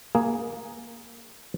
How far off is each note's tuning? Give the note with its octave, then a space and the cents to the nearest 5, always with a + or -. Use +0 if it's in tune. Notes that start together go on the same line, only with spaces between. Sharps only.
A#3 +0 G#4 +0